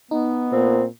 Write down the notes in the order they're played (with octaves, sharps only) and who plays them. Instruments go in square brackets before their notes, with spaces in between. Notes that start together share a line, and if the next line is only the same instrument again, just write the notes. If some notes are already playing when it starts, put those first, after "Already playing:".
[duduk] B3 [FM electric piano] D#4
[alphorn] A#2 [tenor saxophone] C4